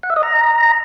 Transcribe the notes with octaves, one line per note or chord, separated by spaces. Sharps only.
F#5
E5
D#5
A#5